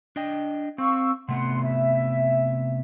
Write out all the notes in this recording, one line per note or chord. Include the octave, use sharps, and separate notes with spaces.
D4 D#5 G5
C4 F5 C#6 E6
C3 A3 B3 F#5 C6
E5